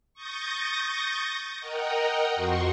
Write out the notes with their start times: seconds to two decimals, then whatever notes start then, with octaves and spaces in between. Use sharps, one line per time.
0.14 C#6 D#6 G6 A6 A#6
1.60 A#4 D#5 F#5 G5 A#5
2.35 F2 F#4 C6 C#6